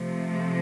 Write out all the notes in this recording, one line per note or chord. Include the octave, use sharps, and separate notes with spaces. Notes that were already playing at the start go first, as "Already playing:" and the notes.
Already playing: C3 F3 A3